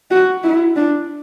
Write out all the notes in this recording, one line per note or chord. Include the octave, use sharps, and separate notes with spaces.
F#4
E4
D4